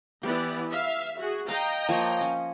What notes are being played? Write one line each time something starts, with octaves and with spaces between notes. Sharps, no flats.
E3 B3 G4 D5
E5 F5
F#4 G#4
D#5 F5 G5 A#5
F3 A#3 C#5
C#4